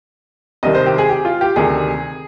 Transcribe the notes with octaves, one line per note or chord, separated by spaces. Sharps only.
C2 C3 D#3 D#5
C5
G4
G#4
G4
F4
G4
D2 C3 D#3 G#4